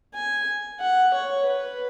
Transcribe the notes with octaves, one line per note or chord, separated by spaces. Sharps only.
G#5
F#5
C#5
B4